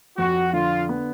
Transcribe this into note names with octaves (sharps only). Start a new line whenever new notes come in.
F2 F#4
D3 F4
B3